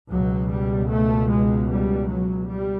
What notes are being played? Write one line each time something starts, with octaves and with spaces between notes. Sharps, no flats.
C#2 B2 F#3
G3
A3
G#3
G3
F#3
G3